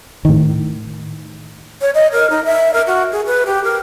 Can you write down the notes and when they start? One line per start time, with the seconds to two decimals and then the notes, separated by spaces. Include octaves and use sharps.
0.25 A2 D#3
1.81 C#5
1.95 D#5
2.12 A#4
2.30 D#4
2.45 E5
2.74 A#4
2.87 F#4
3.12 G#4
3.27 B4
3.46 G4
3.64 A#4